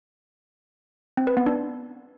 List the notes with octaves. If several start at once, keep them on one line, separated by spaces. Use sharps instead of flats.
C4
B4
B3
D4